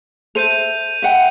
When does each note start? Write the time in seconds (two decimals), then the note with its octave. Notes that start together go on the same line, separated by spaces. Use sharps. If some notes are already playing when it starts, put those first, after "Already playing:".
0.35 A4 C5 E5 G6 D#7 F7
1.02 E5 F#5 G5